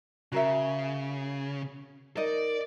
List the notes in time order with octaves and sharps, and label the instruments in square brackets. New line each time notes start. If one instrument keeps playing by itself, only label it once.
[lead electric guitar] C#3 [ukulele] F#4 A#4 E5
[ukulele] D#4 D#5 [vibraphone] A#4 [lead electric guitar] D5